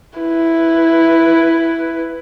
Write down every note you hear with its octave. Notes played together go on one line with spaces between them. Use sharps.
E4 B4